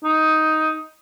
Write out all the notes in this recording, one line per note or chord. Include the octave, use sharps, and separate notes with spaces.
D#4